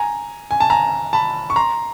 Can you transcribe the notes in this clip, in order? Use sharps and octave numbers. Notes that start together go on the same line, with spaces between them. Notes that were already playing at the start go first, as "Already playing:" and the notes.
Already playing: G#5 A#5
G#5
A5
G#5 A#5
A5 B5
C#6
A#5 C6